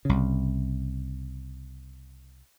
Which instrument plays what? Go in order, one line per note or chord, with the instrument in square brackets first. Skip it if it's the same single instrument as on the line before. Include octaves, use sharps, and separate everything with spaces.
[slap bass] C2 C#3